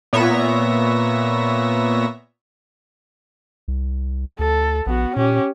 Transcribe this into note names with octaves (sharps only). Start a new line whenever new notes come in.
A#2 B3 C#5 E5 A#6
C2
D2 A4
A#1 B3 F#4
A#2 C#4 G4